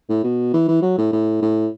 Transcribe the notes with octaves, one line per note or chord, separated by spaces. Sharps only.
A2
B2
E3
E3
F#3
A2
A2
A2